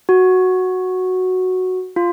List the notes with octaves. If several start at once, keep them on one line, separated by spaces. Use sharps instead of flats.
F#4
F4